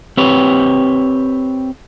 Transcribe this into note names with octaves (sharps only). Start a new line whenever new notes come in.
C4 G4 B4 C#5